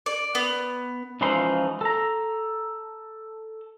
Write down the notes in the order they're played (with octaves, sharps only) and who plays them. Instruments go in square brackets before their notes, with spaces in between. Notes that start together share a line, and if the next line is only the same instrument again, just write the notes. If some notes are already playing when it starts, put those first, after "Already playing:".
[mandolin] D5
B3
[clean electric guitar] C#2 C#3 E3 F3 D#4 C6
A4 A#5